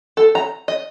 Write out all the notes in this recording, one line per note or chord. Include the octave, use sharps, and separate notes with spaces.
A4
A#5
D#5